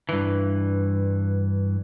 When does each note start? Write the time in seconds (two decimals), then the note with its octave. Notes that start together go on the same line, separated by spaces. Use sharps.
0.09 G2 E3